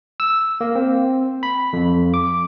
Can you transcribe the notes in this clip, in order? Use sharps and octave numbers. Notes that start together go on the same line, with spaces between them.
E6
A#3
C4
B5
F2
D6